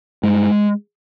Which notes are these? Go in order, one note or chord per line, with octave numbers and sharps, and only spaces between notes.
G2 G#3